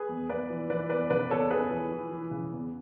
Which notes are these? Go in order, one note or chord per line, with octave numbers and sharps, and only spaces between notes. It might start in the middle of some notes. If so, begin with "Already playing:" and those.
Already playing: G#4 B4
E2
E2 B4 D5
E3
E3 B4 D5
E2 B4 D5
C#3 B4 D5
E2 A4 C#5
E2 G#4 B4
E3
E3
E3
C#3
E2